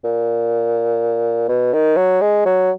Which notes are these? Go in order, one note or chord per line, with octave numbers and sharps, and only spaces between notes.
A#2
B2
D#3
F#3
G#3
F#3